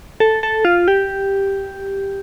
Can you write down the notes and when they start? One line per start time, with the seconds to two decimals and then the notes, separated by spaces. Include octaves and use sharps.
0.20 A4
0.43 A4
0.65 F4
0.88 G4